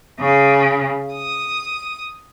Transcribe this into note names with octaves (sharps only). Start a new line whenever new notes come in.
C#3
D#6